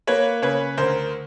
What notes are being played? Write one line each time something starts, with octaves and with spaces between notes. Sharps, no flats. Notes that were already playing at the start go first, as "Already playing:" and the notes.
A#3 B4 C#5
C#3 B4 C#5
D2 A#4 C5